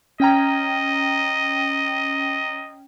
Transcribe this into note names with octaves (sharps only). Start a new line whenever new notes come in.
C#4 D#5 G5 A#5